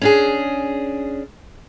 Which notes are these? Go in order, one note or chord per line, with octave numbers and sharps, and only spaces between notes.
C#4 D4 G#4